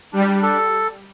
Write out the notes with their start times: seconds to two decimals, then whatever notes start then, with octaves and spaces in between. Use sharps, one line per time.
0.13 G3 D4
0.43 A4